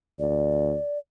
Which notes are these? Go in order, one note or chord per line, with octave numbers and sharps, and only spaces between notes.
D2 D5